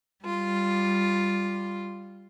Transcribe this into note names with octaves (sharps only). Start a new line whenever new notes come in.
G3 F4